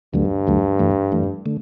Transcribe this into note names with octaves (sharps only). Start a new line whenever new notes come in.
D2 G2 D3 F#3 A3
D2 D3 F#3 A3
F#2 E3 A3
F#2 E3 A3
D3 A3